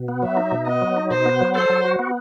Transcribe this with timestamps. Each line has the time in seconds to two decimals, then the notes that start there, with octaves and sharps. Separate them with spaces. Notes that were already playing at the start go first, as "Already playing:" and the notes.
Already playing: B2
0.08 B3
0.23 F#3 E5
0.37 D#4
0.52 B2
0.66 B3 D#5
0.82 F#3
0.97 D#4
1.11 B2 C5
1.26 B3
1.41 F#3
1.55 A4 C5
1.70 F#3
1.85 F#4
1.99 B3